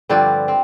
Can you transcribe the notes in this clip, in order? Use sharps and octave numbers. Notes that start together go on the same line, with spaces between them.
G2 D3 F3 C4 B4 D5
C4